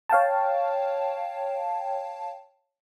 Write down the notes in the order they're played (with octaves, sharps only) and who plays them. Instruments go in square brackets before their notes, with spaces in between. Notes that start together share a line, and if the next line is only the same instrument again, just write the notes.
[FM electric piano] C#5 F5 G5 A5